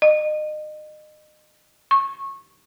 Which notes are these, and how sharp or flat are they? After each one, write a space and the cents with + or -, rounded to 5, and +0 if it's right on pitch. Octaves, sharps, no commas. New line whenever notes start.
D#5 -30
C#6 -20